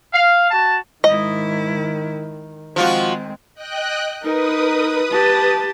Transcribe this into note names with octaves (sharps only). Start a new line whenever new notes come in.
F5
F#4 A5
G#2 D#3 E4 D#5
D#3 F3 G#3 C4 F4 F#4
D#5 G5 F#6
D#4 A#4 B4 D#6
G4 A5